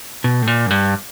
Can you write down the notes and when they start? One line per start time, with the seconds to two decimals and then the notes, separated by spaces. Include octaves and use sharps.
0.24 B2
0.42 A2
0.47 A#2
0.67 F#2
0.70 G2